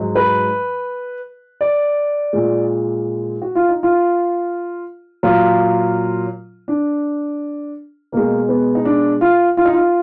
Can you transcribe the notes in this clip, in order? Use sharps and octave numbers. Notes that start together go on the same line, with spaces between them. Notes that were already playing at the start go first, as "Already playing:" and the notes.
Already playing: G#2 F#3
B4
D5
A#2 G#3
F#4
F4
D#4
F4
A#2 F#3 F4
D4
B2 G#3 A#3
B3
D#4
D4
F4
F4
D#4
F4